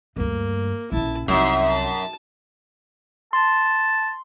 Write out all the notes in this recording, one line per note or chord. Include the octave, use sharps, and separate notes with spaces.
D2 G2 A#3
A#1 C#3 E4 A5
C2 F#2 F3 D#4 E5
A5
A5 C6